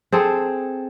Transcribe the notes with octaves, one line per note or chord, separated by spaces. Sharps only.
C4 G#4 A4